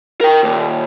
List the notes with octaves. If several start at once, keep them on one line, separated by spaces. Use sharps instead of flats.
A#4 G5
D#2 A#2